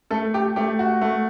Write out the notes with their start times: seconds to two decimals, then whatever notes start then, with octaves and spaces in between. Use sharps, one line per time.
0.11 A3 A4
0.34 G4
0.56 A3 G4
0.79 F#4
1.01 A3